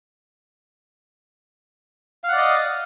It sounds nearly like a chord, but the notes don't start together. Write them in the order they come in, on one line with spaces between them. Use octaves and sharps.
F5 F#5 D5 D#5